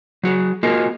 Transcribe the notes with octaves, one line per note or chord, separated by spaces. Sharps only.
F#3 F#4 G#4
A#3 F4 F#4 G#4 A#4 D#5